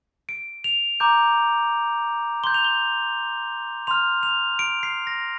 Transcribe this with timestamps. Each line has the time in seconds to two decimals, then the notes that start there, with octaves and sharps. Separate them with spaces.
0.29 D7
0.64 F7
1.00 A#5 D6 G6
2.44 C6 G6 G7
2.54 F7
2.64 G7
3.87 C6 F6 F7
4.23 F7
4.59 D7
4.83 C7
5.07 A#6